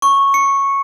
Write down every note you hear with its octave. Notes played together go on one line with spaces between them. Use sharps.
C#6
C#7